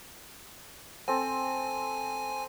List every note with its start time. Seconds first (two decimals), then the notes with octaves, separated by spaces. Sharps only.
1.08 C4 A4 G#5